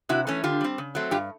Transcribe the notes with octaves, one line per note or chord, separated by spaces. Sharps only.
C3 E4 F#4
E3 A3 C#4
D3 F4 G4
G3 C4
C#3
F#3 A3 C4
G2 F4 G4